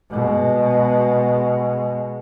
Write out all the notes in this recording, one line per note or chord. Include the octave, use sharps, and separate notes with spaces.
B2 G#3